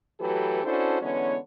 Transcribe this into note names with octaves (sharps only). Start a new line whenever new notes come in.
E3 F#3 A3 G4 A4 B4
C#4 D4 E4 F#4 A4 C5
D3 E3 G#3 B3 C#4 C#5